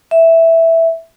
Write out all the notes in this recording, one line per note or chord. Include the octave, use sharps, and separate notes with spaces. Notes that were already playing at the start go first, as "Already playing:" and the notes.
E5